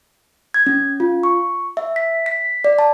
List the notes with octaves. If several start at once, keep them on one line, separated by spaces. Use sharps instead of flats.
G#6
C#4
F4
C#6
E5
B6
B6
D5
A5